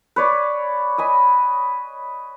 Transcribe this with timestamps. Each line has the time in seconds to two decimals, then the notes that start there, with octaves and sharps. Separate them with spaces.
0.16 B4 C#5 D5
0.98 D#5 G#5 B5